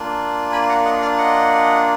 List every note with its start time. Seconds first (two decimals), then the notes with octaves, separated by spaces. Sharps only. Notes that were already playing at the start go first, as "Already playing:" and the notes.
Already playing: A#3 D4 F4
0.52 G#5 B5
0.69 F#5 A#5
0.85 D#5 F#5
1.02 D5 F5
1.18 D#5 F#5